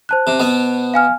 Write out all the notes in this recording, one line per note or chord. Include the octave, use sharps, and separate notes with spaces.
C5 A5 F#6
C3
B2 B3
F5 G#5 F6